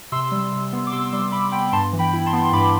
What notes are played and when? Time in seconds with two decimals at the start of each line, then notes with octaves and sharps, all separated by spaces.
0.12 C3 C6 E6
0.31 G3
0.52 C3
0.73 B3
0.87 D6
0.92 C3 C6 E6
1.12 G3 C6 E6
1.32 C3 B5 D6
1.52 B3 G5 B5
1.72 G2 A5 C6
1.93 E3
1.99 G5 B5
2.13 E4
2.26 A5 C6
2.33 B3
2.45 C6
2.52 G2 B5 D6